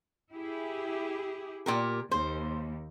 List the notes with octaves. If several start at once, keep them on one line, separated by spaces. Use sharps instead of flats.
E4 G4 G#4
A#2 G4 A#4
D#2 C5